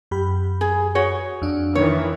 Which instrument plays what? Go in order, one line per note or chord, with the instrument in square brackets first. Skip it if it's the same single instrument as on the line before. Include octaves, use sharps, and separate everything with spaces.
[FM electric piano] F#2 G4 B5
[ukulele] G#4
F#4 G#4 C#5
[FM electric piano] F2 D4
[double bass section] D#3 E3 [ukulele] C#5